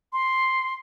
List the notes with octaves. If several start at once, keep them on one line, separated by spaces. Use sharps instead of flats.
C6